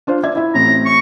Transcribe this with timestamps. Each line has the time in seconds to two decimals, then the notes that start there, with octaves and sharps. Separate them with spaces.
0.07 D4 F4 C5
0.23 D5 E5 G#6
0.36 E4 E5
0.55 A1 A2 C4 A#5
0.86 C#6